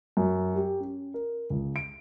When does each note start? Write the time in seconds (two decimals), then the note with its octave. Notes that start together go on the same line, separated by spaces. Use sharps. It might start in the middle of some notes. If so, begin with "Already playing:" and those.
0.17 F#2
0.55 G4
0.80 C#4
1.14 A#4
1.50 C#2
1.76 D7